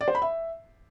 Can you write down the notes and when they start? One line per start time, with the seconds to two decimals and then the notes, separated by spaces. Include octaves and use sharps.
0.01 D5
0.08 C5
0.15 B5
0.22 E5